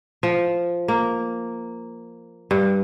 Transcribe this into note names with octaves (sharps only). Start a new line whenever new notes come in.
F3
A#3
G2